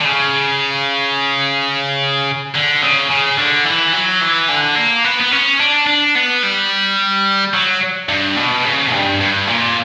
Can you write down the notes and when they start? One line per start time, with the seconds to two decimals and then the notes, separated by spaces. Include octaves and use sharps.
0.01 D3
0.05 C#3
2.55 D3
2.83 C#3
3.10 C#3
3.38 D3
3.65 E3
3.93 F#3
4.21 E3
4.49 D3
4.76 A#3
5.04 B3
5.21 B3
5.31 C#4
5.60 D4
5.87 D4
6.15 B3
6.43 G3
7.54 F#3
8.09 G2
8.37 B2
8.65 C#3
8.93 G2
9.20 G2
9.47 A#2